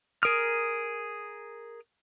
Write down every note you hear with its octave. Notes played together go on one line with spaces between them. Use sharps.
G#4 A#4 D#6 F6